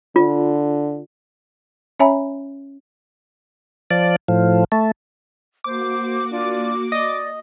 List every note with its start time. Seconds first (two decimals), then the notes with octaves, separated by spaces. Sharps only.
0.16 D3 F4
2.00 C#4 C#5 E5 G#5 A#5 B5
3.91 F3 D5
4.28 A2 F3
4.72 A3
5.64 A#3 F#4 C5 D6
6.31 D4 F4 D5
6.92 D5 D#5